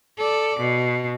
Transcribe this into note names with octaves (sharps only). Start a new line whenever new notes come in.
A4 D5
B2